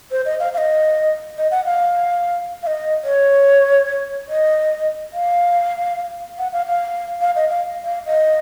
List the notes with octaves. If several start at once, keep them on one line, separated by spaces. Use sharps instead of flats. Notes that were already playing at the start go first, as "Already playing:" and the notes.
C5
D#5
F5
F5
D#5
D#5
F#5
F5
F5
D#5
C#5
D#5
F5
F#5
F5
F5
F5
D#5
F5
F5
D#5